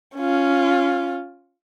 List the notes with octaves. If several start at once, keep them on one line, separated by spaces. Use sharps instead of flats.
C#4 F4